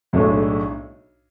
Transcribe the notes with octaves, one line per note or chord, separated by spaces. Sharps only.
B1 A2 G#3 D4